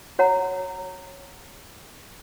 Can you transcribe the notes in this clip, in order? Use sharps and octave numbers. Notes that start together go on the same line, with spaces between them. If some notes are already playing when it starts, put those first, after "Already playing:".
F#4 C#5 F#5 A#5